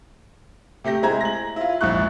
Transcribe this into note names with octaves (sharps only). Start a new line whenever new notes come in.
C3 A3 G4 A#6
G#3 E4 C5 A#5 G#6
A#6 F#7
E4 F4
A#1 G#2 E4 C#6 F#6